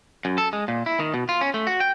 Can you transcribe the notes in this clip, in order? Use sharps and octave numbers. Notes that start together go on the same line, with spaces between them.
F#2
A4
G#3
A#2
E4
D#3
B2
F4
C#4
A3
F#4
G5